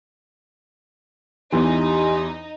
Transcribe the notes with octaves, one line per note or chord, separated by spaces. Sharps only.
E2 E3 D#4 G4 G#5 C6